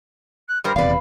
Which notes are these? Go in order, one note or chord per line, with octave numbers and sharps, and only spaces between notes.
F#6
G2 G3 A#4 C5
D#1 E2 C3 B4 D5 F5